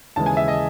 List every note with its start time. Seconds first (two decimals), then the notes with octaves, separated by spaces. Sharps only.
0.16 D#2 C#3 E3 G#3 A5
0.26 G#5
0.37 E5
0.48 D#5